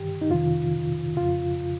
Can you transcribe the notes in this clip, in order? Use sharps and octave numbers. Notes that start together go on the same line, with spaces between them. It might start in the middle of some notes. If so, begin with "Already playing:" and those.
Already playing: G2 D#3 G4
D#4
F2 C3 D#3 F4
F2 C#3 F4